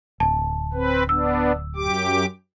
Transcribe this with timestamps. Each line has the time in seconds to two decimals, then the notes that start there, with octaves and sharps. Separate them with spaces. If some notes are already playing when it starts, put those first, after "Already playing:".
0.20 D1 A5
0.73 C4 B4
1.09 B3 D4 E6
1.76 F#2 G4 D6